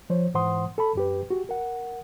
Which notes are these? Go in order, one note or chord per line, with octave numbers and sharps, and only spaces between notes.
F3 C5 C#5
G#2 E3 C5 F#5 C6 D#6
A4 A5 B5
F#2 G4 B4
F#4 G4
A#4 F#5